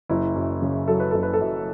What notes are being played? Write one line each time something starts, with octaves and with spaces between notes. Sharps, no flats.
F#1 E4
F#2
C#3
F#3 A4
B4
F#1 A4
B4
A4
F#2